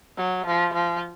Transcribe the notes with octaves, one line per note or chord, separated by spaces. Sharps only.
F#3
F3
F3